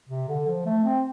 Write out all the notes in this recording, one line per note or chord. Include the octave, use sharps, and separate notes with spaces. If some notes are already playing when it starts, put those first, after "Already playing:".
C3
D3
F3
A3
C4